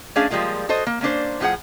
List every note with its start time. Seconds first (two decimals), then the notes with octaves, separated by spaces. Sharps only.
0.16 A3 C#4 D4 G#4 F5
0.30 F3 G3 G#3 A#3 F4
0.69 F#4 A4 C5 D#5
0.87 A#3
1.01 A#3 C#4 D4 C5
1.40 A2 F3 F4 G#4 F#5